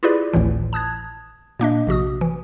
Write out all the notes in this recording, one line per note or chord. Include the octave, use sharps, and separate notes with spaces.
E4 F4 G4 G#4 B4 D5
G#1 D2 A2 E3
A5 D#6 F#6 G#6
A#2 A#3 D4 D#5
A#1 C3 F#4 D#6
E3